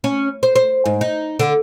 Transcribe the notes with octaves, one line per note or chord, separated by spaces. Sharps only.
C#4
C5
C5
G#2
D#4
D3